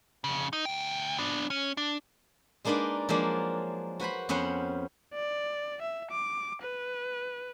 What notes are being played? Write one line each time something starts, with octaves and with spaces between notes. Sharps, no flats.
F2 C#3
D#4
D2 G5
B3 D4
C#4
D4
G#3 A#3 D4 D#4 B4 D5
F3 F#3 G#3 A#3 D4
F#4 B4 C5 B5
F2 B3 C#4 C5 F#5
D5
E5
D6
B4